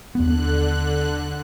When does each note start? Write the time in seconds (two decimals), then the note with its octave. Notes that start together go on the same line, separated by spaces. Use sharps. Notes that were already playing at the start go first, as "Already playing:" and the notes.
0.15 D#2 D3 B3 F#6